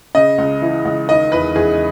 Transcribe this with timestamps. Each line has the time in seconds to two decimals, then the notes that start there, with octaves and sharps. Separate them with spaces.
0.15 C#3 D#5
0.38 C#2
0.62 E3
0.85 C#2
1.08 D#3 D#5
1.31 E2 B4
1.55 E2 G#4